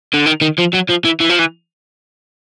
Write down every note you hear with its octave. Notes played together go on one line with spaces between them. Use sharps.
D3
D#3
D#3
F3
F#3
F3
E3
E3
F3
E3